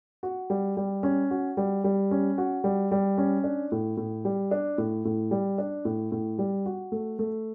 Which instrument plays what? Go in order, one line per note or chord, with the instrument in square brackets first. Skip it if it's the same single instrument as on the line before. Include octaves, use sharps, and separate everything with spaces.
[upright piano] F#4
G3
G3
C#4
F#4
G3
G3
C#4
F#4
G3
G3
C#4
D4
A2
A2
G3
D4
A2
A2
G3
D4
A2
A2
G3
F#4
A3
A3